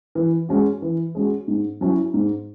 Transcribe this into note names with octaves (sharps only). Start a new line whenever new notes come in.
E3
G#3 C#4 F#4
E3
G#3 C#4 F#4
G#2
F#3 C#4 E4
G#2